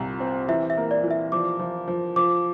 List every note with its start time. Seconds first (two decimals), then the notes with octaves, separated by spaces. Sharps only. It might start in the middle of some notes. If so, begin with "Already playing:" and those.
Already playing: C2 A#2
0.20 C4
0.48 E3 E5
0.70 E5
0.77 A#3
0.91 D5
1.04 E3
1.11 E5
1.32 F3 D6
1.59 F3
1.88 F3
2.16 F3 D6